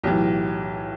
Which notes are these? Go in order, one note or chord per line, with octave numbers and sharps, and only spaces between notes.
B1 A2 E3 G4